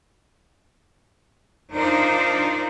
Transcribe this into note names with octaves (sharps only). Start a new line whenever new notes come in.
D4 D#4 F4 A#4 C5